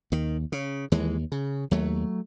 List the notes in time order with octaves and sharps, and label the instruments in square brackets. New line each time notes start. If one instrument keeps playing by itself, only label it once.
[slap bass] D#2 D#3
C#3
D#2 E3 G#3
C#3
D#2 F#3 A3